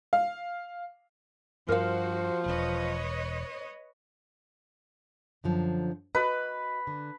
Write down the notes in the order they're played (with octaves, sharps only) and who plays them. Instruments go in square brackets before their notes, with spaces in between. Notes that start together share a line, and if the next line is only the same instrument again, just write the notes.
[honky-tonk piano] F5
[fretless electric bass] G2 [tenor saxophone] F3 [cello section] F#4 C5 [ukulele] A#4 F5
[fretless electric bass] E1 [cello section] B4 C#5 D#5
[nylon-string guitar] F#2 D3 F3
[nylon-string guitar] F#4 D#5 [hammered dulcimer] B4
[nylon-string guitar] D3